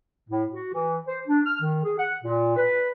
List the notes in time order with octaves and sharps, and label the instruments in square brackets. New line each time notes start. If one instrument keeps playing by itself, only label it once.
[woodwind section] A2
F#4
E3
C5
D4
F6
D#3
G#4
F#5
A#2
B4